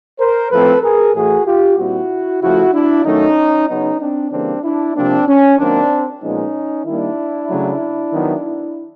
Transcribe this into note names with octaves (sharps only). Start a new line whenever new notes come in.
A#4 C5
A2 F3 A3 C4 A4 B4
G#4 A#4
A2 E3 A3 F#4 G#4
F4 G4
A#2 G3 C4 E4 F#4
C#3 F3 A3 E4 F#4
D4 E4
D#3 F#3 A3 C#4 D#4
C#3 F#3 B3 C#4 D#4
C4 D4
C#3 E3 G3 A#3 C4 D4
D4 E4
C3 F3 A#3 C4 D4
C#4
D#3 F#3 A#3 C4 D4
A#2 F3 G#3 B3 C#4 D#4
D#3 G3 A#3 D4 E4
C#3 F#3 A3
D#3 F#3 B3